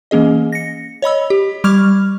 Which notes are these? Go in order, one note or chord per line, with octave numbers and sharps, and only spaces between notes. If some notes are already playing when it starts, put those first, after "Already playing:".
E3 A#3 C#4 G#4 D#5
A#6 C#7
C#5 D#5 B5 E6
G4
G3 C#6 D6 F6 G#6 F7